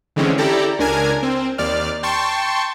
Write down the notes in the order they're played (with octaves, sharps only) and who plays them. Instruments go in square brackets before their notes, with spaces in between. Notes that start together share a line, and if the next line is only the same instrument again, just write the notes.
[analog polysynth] D3 E3 G#3 C4 C#4
E4 G4 A4 D5 A#5
C#2 D4 A#4 G#5 G#6
C4
D#2 D5 F6
G5 A5 C6 C#6